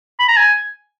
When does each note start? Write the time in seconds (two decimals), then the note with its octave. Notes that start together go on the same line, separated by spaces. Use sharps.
0.19 B5
0.28 A#5
0.37 G#5